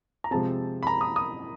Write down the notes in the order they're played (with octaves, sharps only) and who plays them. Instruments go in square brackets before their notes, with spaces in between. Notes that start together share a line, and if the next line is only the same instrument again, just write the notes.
[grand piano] A#5
C3 F3 G#3 C4 A5
B5
A#5
D#6
D#6